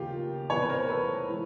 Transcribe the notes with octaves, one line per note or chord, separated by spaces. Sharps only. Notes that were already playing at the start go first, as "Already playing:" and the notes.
Already playing: D#2 C#3 F3 A#3 F4 G4
E2 C3 E3 B4 C#5
B4
A#4 C5
A4 B4
E3 G#3